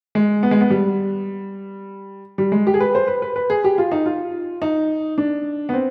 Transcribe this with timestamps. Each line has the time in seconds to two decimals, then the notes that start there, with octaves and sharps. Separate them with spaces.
0.15 G#3
0.43 B3
0.51 G#3
0.61 B3
0.70 G3
2.38 G3
2.52 G#3
2.67 G4
2.74 G#4
2.80 B4
2.95 C5
3.08 B4
3.22 B4
3.36 B4
3.50 G#4
3.64 G4
3.78 F4
3.91 D#4
4.06 F4
4.62 D#4
5.18 D4
5.69 B3
5.74 C4